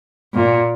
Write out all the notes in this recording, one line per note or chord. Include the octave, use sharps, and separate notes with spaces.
A#2